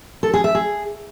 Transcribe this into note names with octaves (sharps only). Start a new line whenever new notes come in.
A4
G#4
E5
G#4